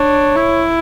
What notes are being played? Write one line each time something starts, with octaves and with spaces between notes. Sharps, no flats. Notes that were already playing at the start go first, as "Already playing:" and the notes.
Already playing: D4 C#5
E4